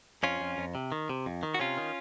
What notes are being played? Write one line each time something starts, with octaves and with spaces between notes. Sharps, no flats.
F2 C#4 F4
F2
F2
C3
D#3
C3
F2
D#3
F#4
C3 C#4 F4
D#3